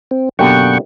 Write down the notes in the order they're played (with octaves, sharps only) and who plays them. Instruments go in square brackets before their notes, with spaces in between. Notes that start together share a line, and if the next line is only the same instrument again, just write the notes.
[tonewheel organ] C4
[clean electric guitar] F#2 B2 [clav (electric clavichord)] D3 A#3 G4 [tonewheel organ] F#5 G5 C#6